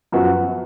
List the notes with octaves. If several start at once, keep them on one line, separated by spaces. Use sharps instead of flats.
F#2 F3 B3 F#4